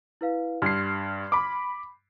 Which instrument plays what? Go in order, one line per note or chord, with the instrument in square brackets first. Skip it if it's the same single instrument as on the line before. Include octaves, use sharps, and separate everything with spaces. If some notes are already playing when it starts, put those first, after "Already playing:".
[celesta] E4 B4 F5
[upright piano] G2 C7 [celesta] C6 F6 G#6
[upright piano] B5 D6